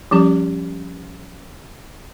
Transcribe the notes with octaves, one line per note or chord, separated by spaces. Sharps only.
F3 G3 C#4 G4